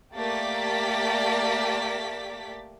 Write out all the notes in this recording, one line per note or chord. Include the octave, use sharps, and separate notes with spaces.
A3 A#3 G4 D5 A6 B6